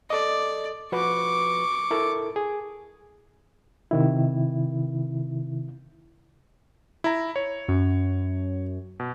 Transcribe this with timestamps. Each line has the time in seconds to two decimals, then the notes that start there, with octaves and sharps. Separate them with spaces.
0.10 A4 D5 D#5
0.92 F3 F#4 B4 C#6 D6
1.91 E4 A4 A#4
2.36 G#4
3.91 C3 D#3 E4
7.04 E4 A#5
7.36 C#5
7.68 F#2
9.00 B2